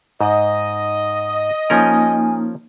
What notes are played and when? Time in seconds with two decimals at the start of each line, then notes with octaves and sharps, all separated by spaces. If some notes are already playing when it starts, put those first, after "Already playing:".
0.21 G#2 D#5
1.70 F3 A#3 C#4 D#4 A#4 G#5